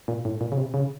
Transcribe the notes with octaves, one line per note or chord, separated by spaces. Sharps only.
A#2
A2
A#2
C#3
C3
C#3